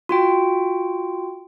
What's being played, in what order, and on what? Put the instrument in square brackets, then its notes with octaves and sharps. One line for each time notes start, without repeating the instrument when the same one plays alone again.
[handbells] F4 F#4 G5